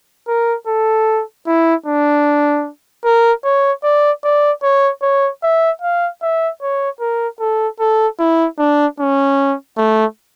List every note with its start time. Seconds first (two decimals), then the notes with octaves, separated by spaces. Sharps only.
0.28 A#4
0.67 A4
1.47 E4
1.86 D4
3.05 A#4
3.44 C#5
3.84 D5
4.24 D5
4.63 C#5
5.02 C#5
5.43 E5
5.81 F5
6.22 E5
6.62 C#5
7.00 A#4
7.40 A4
7.80 A4
8.19 E4
8.59 D4
8.99 C#4
9.77 A3